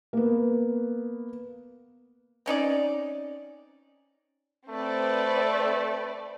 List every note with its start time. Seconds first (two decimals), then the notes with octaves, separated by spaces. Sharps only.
0.13 A#3 B3
2.46 C4 C#4 D#4 D5
4.69 A3 C4 B4 D5